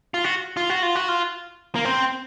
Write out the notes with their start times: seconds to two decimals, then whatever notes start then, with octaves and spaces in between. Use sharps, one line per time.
0.14 F4
0.24 F#4
0.57 F4
0.70 F#4
0.82 F4
0.95 F#4
1.08 F4
1.75 A#3
1.85 C4